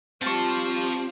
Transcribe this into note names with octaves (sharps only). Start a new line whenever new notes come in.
G3 C4 F4 C5 F5 A5 C#6